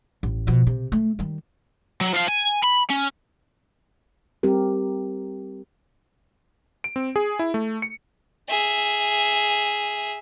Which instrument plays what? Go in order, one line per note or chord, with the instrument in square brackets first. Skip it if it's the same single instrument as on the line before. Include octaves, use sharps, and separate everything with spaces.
[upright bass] A1
B2 F3
C3
A3
D#3 G3
[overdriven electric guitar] F#3
F3 F5
G#5
B5
C#4
[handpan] G3 C4 G4 A#4
[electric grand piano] D7
C4
G#4
E4
A3
C#7
[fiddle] G#4 E5